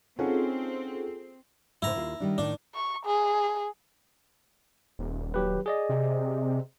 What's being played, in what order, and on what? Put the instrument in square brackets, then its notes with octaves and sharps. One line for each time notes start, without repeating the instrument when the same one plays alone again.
[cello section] C4 [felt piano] C#4 D#4 F#5 [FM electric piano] F4 G#4 A4
[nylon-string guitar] A2 D3 C5 [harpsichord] E4 A#5
[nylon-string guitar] D#2 F4
D#3 G3 D4
[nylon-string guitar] A2 D#3 [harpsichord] D4
[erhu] C#6
G#4
[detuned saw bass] D#1
[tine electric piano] F#3 G4 B4
G#4 D5 D#5
[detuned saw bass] C3